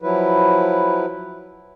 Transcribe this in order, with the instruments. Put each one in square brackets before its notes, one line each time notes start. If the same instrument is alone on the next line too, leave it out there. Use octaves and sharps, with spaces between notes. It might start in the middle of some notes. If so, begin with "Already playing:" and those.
[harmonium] F3 F#3 E4 B4